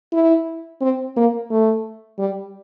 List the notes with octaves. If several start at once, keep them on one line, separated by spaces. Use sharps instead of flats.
E4
C4
A#3
A3
G3